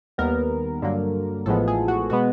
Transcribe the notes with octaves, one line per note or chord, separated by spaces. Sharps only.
D#2 D#3 G3 B3 A#4
G2 D3 F#3 A#3
A1 A2 F3 G#3 B3 A4
G#4
F#4
B2 G#3 B3 F#4